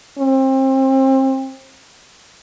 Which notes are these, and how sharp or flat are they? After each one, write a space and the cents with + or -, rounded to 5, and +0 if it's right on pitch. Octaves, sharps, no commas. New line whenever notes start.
C4 +30